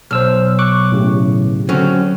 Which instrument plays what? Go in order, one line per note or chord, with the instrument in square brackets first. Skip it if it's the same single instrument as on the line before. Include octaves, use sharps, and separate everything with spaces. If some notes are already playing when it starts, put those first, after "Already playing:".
[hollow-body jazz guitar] B1 [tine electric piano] C5 E6 F6
[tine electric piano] C#6 D6 F#6
A2 C#3 G4
[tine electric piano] D3 [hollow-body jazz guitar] F#3 C4 C#4